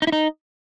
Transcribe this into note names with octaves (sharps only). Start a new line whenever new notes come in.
D#4
E4
D#4